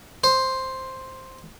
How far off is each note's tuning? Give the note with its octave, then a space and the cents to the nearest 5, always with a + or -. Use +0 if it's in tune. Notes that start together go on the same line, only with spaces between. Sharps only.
C5 +5